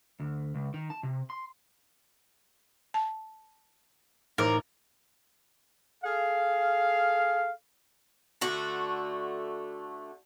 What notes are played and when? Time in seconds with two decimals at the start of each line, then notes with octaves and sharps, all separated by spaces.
0.20 D2
0.55 C#2
0.74 D#3
0.90 A5
1.03 C3
1.30 C6
2.94 A5
4.38 A1 A2 D#4 A#4 C5 D6
6.03 G#4 A4 F5
8.41 D3 A3 F#4